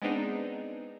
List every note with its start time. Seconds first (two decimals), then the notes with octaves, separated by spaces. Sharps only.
0.02 G#3 B3 C4 D4 D#4